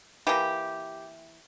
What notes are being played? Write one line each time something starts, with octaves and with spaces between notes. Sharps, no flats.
E3 A#3 G4